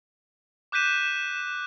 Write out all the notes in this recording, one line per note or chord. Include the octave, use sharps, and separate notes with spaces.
D6 F#6 G6 B6 D#7 E7